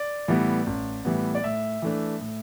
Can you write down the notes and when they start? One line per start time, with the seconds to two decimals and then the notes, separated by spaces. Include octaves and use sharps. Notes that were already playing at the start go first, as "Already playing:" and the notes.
Already playing: D5
0.28 A2 E3 G3 B3
0.67 A1
1.05 A2 E3 G3 B3
1.35 D5
1.44 A2 E5
1.82 E3 A3 D4
2.21 A2